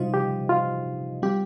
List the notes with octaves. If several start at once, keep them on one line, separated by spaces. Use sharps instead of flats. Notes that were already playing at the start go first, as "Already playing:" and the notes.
Already playing: C3 G3 D#4 F4 C5 D#5
G4
F4
G3 C4 F4 G4